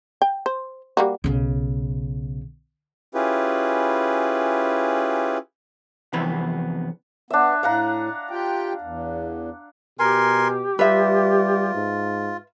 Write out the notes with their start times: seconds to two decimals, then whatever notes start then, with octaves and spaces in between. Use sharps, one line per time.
0.22 G5
0.46 C5
0.97 G3 A#3 F#4
1.24 B1 C#3
3.15 C#4 E4 F4 G4 G#4 B4
6.13 F2 C3 E3 B3 B4 B5
7.30 B3 D4 E5
7.63 A2 F5 F#5 A#5
8.30 F4 G4 G5
8.81 E2
9.99 B2 G4 A#4 G#5 C6
10.79 G3 F4 B4 E5
11.74 G#2